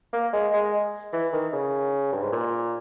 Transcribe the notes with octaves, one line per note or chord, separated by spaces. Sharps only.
A#3
G#3
G#3
E3
D#3
C#3
G2
G#2
A#2